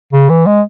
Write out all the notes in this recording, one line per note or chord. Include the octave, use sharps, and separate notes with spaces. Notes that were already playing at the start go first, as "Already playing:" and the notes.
C#3
E3
G#3